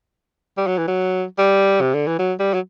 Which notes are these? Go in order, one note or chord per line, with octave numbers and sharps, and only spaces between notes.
G3
F#3
E3
F#3
G3
C3
D3
E3
F#3
G3
F#3